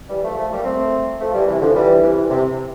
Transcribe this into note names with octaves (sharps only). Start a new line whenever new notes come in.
E3 G3
F3 A3
F3 A3
G3 A#3
A3 C4
F3 A3
E3 G3
C3 E3
D3 F3
E3 G3
C3 E3
C3